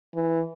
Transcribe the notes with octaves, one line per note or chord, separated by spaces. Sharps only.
E3